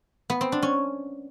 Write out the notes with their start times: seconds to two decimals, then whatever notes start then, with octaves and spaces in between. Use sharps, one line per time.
0.30 B3
0.41 C4
0.52 D4
0.62 C#4